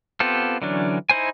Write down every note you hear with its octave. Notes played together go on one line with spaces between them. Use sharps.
B3 C4 F4 G4 A4
D3 E3 F#3 C#4 D4
D#4 E4 C5 G#5